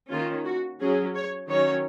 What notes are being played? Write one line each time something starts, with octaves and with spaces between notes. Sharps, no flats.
D#3 A#3 C#4 F4
F#4
F#3 C#4 G#4
C#5
D#3 F#3 C#4 C#5